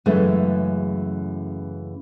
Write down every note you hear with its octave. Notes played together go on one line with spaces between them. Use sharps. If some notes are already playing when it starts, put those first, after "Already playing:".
F#2 C#3 E3 G#3 A3 C#4